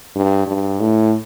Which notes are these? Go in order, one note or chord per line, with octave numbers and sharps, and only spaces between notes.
G2
G2
A2